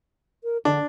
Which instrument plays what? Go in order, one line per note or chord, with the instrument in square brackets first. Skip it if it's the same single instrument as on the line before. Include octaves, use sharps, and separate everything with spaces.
[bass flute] A#4
[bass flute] D3 [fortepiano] D4